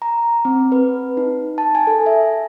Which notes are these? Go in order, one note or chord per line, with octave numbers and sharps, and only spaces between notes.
A#5
C4
B4
D#4
A5
G#5
A4
E5